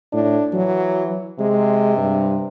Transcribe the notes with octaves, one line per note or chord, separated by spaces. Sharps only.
A2 D4
E3 F#3
C3 G#3
G2